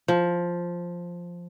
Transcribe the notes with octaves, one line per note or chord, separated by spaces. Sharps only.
F3